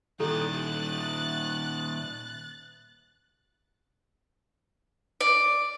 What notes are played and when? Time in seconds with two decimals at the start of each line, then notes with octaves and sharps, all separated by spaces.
0.20 A#2 D#3 E4 G4 A4 F#6 A6
5.21 D5